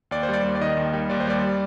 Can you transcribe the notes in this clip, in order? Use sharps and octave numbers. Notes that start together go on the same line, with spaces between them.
D#2 D5
C5
G3 D5
D#2
D5
D#3 D#5
D#2
G3
D#2 D5
C5
G3 D5